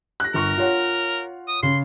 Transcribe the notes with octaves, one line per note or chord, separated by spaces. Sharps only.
F#6 A#6
G1 A#4 C#6
F4 C#5 F#5
D#6
C#3 C6